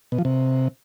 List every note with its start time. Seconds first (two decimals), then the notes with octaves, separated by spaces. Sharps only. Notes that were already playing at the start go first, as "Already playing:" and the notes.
0.12 B2
0.18 F3
0.25 C3